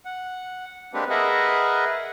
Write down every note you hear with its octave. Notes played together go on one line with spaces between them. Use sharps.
F#5
G#3 A#3 C4 D4 G4 B4
G#4 A#4 B4 D#5 E5 F#5